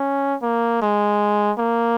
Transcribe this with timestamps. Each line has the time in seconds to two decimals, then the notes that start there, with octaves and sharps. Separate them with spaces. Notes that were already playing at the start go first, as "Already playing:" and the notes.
Already playing: C#4
0.42 A#3
0.82 G#3
1.58 A#3